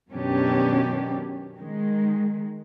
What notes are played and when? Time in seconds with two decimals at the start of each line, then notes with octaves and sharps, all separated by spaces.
0.10 F#2 B2 D#3 C#4 D4 G4
1.56 D#3 G#3